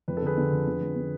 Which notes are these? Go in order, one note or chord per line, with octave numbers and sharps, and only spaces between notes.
F2 B4
A4
D3 G#4 B4
D3
F2
D3
F2
D3